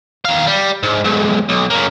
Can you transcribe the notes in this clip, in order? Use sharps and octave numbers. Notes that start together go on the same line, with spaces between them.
D#3 F5
G3
G#2
B1 G#2
B1
C#3 A#3